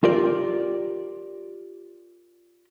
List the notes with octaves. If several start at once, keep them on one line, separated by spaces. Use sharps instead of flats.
F4 G4 A#4 D5